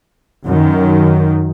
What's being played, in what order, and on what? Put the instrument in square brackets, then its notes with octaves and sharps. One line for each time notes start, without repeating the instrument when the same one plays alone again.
[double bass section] F#2 D#3